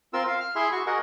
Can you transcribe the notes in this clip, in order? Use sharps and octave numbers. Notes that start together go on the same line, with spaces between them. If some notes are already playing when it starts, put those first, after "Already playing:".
C4 F4 A#4 E6
F5
F6
E4 G#4 E5 C6
F#4 C#6
F#4 G#4 A#4 D#5 F#5